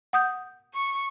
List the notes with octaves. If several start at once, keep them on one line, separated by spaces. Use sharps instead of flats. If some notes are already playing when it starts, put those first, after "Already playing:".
F#5 D#6 G6
C#6